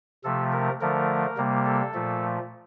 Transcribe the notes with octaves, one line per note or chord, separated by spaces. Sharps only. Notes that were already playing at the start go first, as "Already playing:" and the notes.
C3 F3 A3 A4
A#4
D3 F3 A3 A#4
C3 G3 A#3
A4
A#2 F3 A3